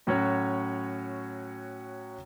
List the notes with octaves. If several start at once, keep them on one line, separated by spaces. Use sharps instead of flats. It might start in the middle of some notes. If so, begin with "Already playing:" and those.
A2 F#3 C#4 F#4 C#5